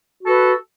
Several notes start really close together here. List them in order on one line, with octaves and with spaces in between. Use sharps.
F#4 A4 B4